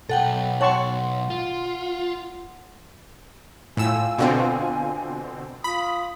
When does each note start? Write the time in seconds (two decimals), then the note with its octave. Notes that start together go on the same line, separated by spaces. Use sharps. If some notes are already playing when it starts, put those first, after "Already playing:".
0.09 B1 A4 F#5 G5
0.61 C#5 F#5 A5 C6 C#6
1.30 F4
3.77 A2 F4 G5 G#5 E6
4.18 B2 D3 C4
5.64 F4 B5 D#6